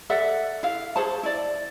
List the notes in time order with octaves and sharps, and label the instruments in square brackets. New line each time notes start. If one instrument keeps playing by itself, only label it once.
[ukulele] A4 D5 E5 F#5
E4 F5
G#4 C5 C#5 A5
E4 D5